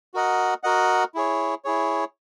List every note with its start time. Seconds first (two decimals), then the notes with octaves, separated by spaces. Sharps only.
0.14 F#4 A#4 D#5 F#5
0.63 F#4 A#4 D#5 F#5
1.15 E4 G#4 C#5
1.65 E4 G#4 C#5